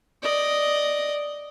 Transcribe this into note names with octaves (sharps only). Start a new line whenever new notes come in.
D5 D#5